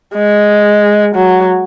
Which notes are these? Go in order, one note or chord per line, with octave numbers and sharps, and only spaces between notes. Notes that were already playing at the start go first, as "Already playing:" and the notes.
G#3
F#3